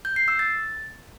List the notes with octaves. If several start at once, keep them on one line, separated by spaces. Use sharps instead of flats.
G6
C7
E6
A6